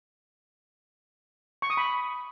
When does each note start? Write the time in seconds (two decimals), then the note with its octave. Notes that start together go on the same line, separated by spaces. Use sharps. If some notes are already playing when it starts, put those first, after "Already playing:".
1.62 C#6
1.70 D#6
1.77 B5